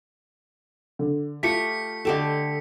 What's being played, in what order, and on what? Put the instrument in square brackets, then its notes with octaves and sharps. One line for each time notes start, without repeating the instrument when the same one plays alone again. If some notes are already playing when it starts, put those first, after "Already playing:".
[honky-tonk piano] D3
[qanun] A3 G4 [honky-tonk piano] F4 [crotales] B6 C#7
[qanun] D3 G4 A5 [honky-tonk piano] A4 D#5